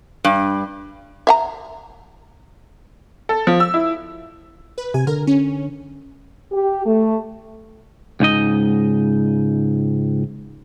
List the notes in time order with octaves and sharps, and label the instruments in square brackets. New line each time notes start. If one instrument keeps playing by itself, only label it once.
[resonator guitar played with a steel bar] G2
[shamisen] E5 F5 A#5
[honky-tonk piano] A4
F3
E6
E4
[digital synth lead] B4
[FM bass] C3 [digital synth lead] G#5
[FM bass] D3 [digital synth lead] A#4
[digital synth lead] C#4
[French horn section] G4
A3
[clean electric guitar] C#2 G#2 D#4 D#5